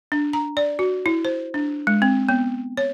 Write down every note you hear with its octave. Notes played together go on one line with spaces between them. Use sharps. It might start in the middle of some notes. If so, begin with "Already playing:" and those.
D4
A#5
D5
F#4
E4
C5
D4
G#3
C4
B3
C#5